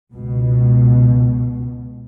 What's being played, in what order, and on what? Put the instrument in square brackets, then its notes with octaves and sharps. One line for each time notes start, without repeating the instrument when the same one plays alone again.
[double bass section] C#2 B2